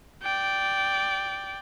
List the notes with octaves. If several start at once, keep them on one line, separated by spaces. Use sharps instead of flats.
D5 G5